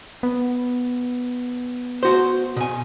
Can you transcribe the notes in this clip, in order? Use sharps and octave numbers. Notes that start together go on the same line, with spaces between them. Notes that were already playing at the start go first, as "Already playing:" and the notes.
B3
F#4 C5
B2 G#5